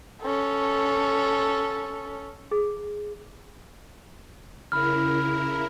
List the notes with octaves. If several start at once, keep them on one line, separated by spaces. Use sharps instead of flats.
C#4 A4
G#4
C#3 E4 A#4 B5 F6